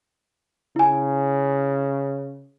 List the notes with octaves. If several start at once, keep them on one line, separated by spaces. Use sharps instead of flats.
C#3 E4 G#5